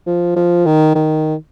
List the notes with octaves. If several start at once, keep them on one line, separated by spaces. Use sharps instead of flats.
F3
F3
D#3
D#3